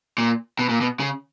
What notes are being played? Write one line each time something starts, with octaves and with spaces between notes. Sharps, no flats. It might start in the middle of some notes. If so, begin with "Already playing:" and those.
A#2
B2
A#2
B2
C#3